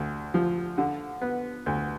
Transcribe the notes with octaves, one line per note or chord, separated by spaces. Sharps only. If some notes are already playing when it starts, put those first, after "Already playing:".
Already playing: D2
F3
D3
B3
D2